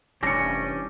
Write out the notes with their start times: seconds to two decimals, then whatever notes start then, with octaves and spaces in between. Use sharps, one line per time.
0.23 F1 E3 G3 C#4 D4 A#6 C#7